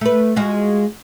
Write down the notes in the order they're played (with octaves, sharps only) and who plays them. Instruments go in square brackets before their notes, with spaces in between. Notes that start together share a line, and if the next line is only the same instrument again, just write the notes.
[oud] A3 B4
G#3 F4 F#4